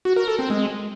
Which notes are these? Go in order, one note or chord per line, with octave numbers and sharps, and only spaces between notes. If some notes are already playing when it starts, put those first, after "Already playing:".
F#4
A#4
A4
C4
G#3